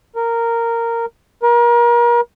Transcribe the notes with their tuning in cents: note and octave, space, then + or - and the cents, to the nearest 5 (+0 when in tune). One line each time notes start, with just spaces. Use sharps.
A#4 -10
A#4 +35